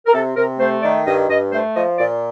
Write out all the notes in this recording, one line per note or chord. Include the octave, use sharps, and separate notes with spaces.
A#4
C3 A4
C3 A#4
A3 C5
D#3 D5
G2 D#5
G2 D#5
A3 C5
F3 D#5
A#2 D5